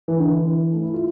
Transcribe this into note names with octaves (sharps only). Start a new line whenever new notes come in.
E3
D3
E3
A3
E4
F4